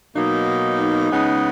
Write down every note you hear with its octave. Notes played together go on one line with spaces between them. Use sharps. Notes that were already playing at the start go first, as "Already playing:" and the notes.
B2 F#3 A#3 D#4
C#3 G#3 B3 D#4